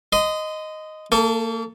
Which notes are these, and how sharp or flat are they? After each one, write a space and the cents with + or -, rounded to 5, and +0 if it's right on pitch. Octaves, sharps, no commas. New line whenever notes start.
D#5 +0 C6 -35
A#3 -35 A4 +0